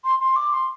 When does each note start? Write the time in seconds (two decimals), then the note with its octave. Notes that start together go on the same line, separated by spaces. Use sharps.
0.04 C6
0.20 C6
0.36 D6
0.53 C6